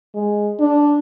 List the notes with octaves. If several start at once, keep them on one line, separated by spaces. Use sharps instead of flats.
G#3
D4